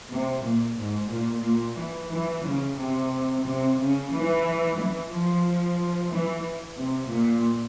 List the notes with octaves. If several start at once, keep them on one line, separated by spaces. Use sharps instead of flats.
C3
A#2
G#2
A#2
A#2
E3
E3
C#3
C3
C3
C#3
E3
E3
F3
E3
C3
A#2